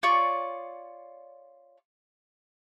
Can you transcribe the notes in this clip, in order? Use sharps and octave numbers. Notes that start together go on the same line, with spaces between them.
F4 C#5 D5 C#6